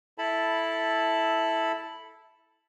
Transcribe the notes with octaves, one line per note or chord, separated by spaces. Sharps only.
E4 A4 A5 B5